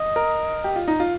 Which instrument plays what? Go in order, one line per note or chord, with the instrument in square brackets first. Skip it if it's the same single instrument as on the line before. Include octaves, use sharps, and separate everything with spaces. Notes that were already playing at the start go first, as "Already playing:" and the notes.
Already playing: [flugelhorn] D#5
[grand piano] A#4
G4
F4
D#4
F4